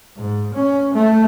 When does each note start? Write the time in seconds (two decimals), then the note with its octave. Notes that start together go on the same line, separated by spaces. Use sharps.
0.16 G#2
0.54 C#4
0.94 A3